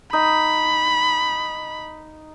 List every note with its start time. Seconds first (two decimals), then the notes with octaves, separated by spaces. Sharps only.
0.13 D#4 B5